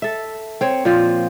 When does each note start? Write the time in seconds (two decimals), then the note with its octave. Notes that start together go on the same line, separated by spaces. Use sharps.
0.02 A4 E5
0.61 C4 C#5
0.85 A#2 F3 C4